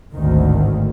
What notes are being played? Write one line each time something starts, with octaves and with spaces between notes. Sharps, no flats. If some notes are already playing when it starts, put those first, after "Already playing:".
G#1 D2 A2 D#3